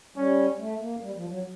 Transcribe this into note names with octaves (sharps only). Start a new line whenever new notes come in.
G3 C#4
A3
A#3
G3
F3
F#3